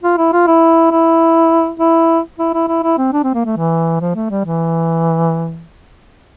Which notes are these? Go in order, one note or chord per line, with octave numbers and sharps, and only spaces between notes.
F4
E4
F4
E4
E4
E4
E4
E4
E4
E4
C4
D4
C4
A#3
A3
E3
F3
A3
G3
E3